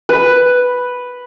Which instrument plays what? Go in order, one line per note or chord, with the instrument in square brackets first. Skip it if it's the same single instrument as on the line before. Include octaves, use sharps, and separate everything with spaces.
[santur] B4